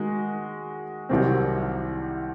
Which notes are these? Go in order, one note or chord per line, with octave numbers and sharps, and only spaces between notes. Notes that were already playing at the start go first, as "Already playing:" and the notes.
Already playing: D#3 G#3 D#4 F#4
C2 C3 D#3 F#3 C4